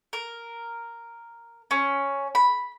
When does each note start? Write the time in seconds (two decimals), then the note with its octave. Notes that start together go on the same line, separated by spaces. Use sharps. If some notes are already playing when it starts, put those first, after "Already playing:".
0.13 A#4
1.71 C#4
2.35 B5